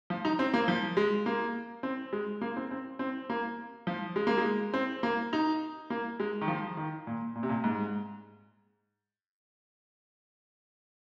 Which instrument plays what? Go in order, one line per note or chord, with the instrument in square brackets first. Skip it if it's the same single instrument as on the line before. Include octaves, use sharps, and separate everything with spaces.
[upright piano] F3
D#4
C4
A#3
F3
G#3
A#3
C4
G#3
A#3
C4
C4
C4
A#3
F3
G#3
A#3
G#3
C4
A#3
D#4
A#3
G#3
D#3
F3
D#3
A#2
A#2
C3
A#2
G#2